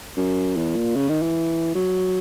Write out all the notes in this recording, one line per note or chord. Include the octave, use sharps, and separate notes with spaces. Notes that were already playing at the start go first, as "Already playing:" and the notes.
F#2
E2
A#2
C#3
D#3
E3
F#3